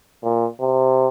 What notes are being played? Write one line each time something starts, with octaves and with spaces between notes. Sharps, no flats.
A#2
C3